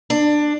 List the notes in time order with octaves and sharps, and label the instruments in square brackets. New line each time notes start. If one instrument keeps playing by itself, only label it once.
[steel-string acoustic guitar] D4